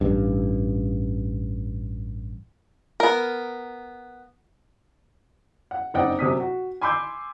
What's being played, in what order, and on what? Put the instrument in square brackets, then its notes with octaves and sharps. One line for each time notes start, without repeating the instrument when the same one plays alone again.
[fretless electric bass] A1 G2
[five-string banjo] B3 A#4
[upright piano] F#5
F#1 C4 D#4 D5 F#5 G5
F#2 C3 D#6 B6
F#4
G#5 B5 C6 D6 E6 G6